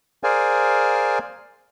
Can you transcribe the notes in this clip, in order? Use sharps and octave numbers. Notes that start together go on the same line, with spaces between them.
G#4 A#4 C5 D5 F5 G#5